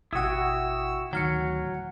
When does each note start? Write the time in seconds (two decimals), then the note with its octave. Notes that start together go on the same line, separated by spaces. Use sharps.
0.13 G#1 B2 E4 F#4 F#5 G5 D#6 E6
1.13 D2 A2 D#3 F#3 F#5 F6 C#7